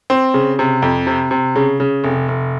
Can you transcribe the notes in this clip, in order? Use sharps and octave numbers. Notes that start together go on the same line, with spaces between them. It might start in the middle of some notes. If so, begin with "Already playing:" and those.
C4
C#3
C3
F2
C3
C3
C#3
C#3
F1
F1